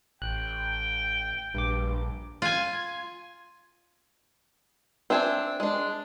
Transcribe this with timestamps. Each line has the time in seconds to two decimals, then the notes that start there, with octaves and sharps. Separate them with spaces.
0.22 A1 G5 F#6
1.54 A#1 G2 D6
2.42 F4 G#5
5.10 C4 D4 E5 G#5
5.60 G#3 D4